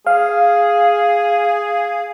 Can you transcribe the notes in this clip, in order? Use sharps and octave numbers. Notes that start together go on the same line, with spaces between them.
G#4 F5